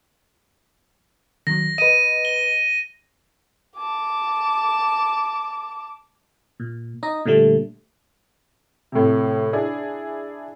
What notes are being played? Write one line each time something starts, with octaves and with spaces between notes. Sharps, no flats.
D#3 F#3 A#6
B4 D#5 D#7
G7
A5 D6
A#2
D#4 D#5
A#2 D3 G3 A3
A2 C3
D4 E4 G#4